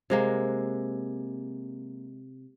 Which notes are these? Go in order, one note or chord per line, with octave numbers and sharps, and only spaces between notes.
C3 G#3 A#3